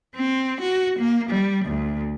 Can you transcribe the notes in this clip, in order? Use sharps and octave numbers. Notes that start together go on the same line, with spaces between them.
C4
F#4
A#3
G3
D2